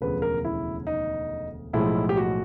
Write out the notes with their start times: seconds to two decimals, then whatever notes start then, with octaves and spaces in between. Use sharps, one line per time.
0.01 E1 D2 C#3 F3 B4
0.22 A#4
0.45 E4
0.87 D#4
1.73 B1 A2 F3 G#3 E4
2.09 G4
2.17 F#4